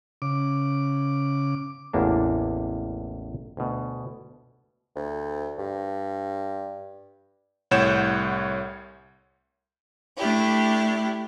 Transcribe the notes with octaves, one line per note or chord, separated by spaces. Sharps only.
C#3 D6
A1 E2 A#3 D4
D2 B2
D2
G2
C2 A2 C#5 F#5 G6 E7
A3 D4 E4 G4